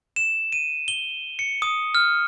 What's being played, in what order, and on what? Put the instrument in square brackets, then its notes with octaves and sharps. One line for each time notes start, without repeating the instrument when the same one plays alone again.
[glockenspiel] E7
D#7
G7
C#7
D#6
F6